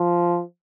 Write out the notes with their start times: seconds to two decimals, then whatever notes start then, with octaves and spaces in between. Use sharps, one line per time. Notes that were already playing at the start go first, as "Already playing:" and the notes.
Already playing: F3